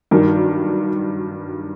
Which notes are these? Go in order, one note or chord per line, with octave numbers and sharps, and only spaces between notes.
G2 D#3 F#3